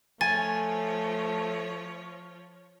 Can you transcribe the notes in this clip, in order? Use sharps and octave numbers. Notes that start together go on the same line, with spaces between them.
F3 A3 C#5 G#5 A6